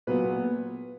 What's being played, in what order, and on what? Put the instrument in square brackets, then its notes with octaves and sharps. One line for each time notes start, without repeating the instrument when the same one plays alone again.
[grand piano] A#2 F#3 B3 B4